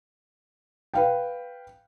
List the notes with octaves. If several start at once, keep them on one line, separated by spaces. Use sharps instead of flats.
B4 F5 G5